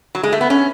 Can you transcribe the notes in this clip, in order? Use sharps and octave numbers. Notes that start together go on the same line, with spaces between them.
F#3
G#3
A3
B3
C#4